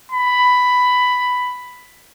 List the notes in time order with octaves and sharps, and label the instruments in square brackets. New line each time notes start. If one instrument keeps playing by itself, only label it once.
[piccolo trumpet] B5